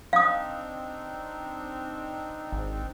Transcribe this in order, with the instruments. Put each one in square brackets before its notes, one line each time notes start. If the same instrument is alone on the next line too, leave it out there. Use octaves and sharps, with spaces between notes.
[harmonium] C4 D4 D#4 [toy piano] F5 D#6
[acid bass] G#1